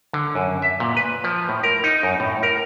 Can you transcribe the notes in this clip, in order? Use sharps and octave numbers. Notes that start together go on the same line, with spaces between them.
D3
F#2
E5
A#2
B4
F3
A2
A#4
D#4
F#2
A2
A#4